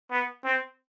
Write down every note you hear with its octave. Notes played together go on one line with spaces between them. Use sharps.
B3
C4